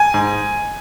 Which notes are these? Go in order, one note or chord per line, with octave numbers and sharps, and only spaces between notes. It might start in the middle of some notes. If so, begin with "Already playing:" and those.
Already playing: G#5
G#2